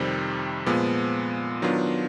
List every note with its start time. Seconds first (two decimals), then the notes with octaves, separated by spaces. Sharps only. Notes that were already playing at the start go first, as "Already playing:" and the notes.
Already playing: F2 C3 D#3 G3 C4
0.66 A#2 F3 G#3 B3
1.62 D#3 F#3 B3 D4 F4